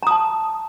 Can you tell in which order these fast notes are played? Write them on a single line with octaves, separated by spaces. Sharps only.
A#5 D#6 A5